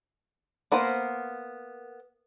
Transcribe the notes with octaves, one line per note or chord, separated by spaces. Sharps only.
A#3 B3 A#4 C5